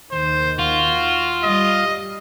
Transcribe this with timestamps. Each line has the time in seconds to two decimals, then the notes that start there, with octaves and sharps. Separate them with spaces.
0.11 D#2 D#3 C5
0.59 F4 F#4
1.43 G3 D#5